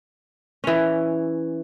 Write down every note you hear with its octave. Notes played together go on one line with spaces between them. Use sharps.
E3 C#4